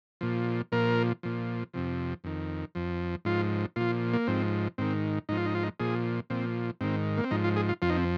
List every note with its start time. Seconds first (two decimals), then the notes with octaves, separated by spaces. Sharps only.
0.21 A#2 F3
0.72 A#2 F3 A#4
1.23 A#2 F3
1.74 F2 C3 F3
2.24 F2 D#3
2.75 F2 F3
3.25 G#2 F3 F4
3.76 A#2 F3 F4
4.13 A#3
4.27 G#2 F3 C4
4.78 G#2 D#3 C4
5.29 G#2 F3 D#4
5.37 F4
5.46 D#4
5.55 F4
5.63 D#4
5.80 A#2 F3 G#4
6.30 A#2 F3 C4
6.81 G#2 D#3 C4
7.17 A#3
7.24 C4
7.31 G#2 F3 D#4
7.44 F4
7.56 G#4
7.69 F4
7.82 F2 F3 F4
7.89 D#4
7.97 C4